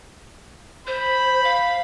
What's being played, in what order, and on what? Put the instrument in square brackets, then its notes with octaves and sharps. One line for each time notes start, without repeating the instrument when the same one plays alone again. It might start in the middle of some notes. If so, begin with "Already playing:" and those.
[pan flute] C5 [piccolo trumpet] B5
[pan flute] F5